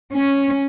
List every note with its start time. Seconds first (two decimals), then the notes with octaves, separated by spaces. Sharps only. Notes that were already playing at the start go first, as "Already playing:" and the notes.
0.13 C#4